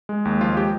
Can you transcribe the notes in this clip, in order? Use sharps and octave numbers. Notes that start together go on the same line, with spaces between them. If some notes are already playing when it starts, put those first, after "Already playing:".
G#3
D#2
F3 F4
G#3 G4